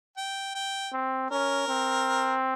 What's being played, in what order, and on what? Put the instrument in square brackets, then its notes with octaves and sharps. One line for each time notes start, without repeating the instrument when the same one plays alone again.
[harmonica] G5
G5
[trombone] C4
[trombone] C#4 [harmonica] A#4
[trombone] C4